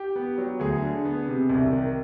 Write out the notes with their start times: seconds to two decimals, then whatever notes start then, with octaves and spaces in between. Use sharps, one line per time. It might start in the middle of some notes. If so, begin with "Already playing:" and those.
Already playing: G4
0.16 B3
0.38 F#3
0.59 D2 G#4
0.82 D3
1.05 B3
1.28 C3
1.50 C2
1.72 D#3